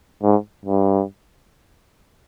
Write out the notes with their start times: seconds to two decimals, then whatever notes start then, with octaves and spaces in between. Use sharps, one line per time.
0.23 G#2
0.65 G2